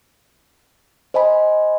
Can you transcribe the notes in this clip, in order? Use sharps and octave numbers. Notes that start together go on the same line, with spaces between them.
C5 D#5 G#5 B5